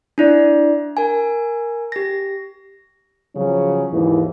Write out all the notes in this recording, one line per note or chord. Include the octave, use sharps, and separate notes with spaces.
D4 E4 D5
A#4 G#5
G4 A#6
C#3 F3 F#3 C#4
D#2 G#2 E3